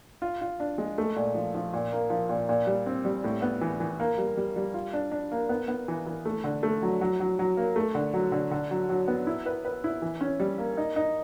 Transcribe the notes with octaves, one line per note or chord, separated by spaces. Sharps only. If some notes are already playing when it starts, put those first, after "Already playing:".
F4
F4
D4
G#3
A3
A#2
F3
F3
A#2
A#3
F3
A#2
A#2
G3
C4
G3
A2
B3
E3
E3
A#3
G3
G3
G3
F4
D4
D4
A#3
B3
B3
E3
E3
A3
D3
A3
F#3
F#3
F#3
F#3
A#3
A3
D3
F#3
D3
D3
F#3
F#3
B3
E4
B4
B4
E4
E3
C#4
G3
A#3
D#4
D#4